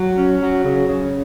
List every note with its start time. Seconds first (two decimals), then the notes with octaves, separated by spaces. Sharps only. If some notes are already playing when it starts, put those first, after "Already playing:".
Already playing: F#3
0.17 C#4
0.41 F#3
0.64 C#3
0.88 C#3